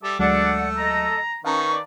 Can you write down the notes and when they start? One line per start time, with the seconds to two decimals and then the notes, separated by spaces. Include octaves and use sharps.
0.03 G3 A4 E5 D6
0.19 D2 F#3 G#3 A3 D4 D5 F#5 E6
0.77 A4 D#5 A#5
1.45 D#3 C#4 B4 F5 A5 A#5 C#6
1.73 D5